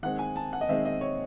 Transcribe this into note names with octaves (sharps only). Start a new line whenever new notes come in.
D#3 G#3 C4 F#5
G#5
A5
F#5
D#5
D#3 G#3 C4 E5
D#5
C#5